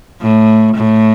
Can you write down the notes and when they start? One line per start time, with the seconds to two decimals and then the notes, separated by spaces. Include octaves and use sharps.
0.21 A2
0.75 A2